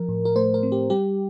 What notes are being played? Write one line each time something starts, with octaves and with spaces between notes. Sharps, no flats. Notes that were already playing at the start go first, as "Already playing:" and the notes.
Already playing: F3 A#4
A2
A#4
A3 C5
A#4
C4
G4
G3 G4